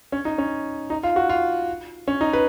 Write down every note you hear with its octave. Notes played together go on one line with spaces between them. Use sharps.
C#4
D#4
C#4
D#4
F4
F#4
F4
C#4
D#4
B4